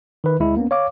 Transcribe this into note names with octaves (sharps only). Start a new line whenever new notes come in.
D#3 B4
D2 G#3 E4
A#3 B3 C#4
C#5 F5 D6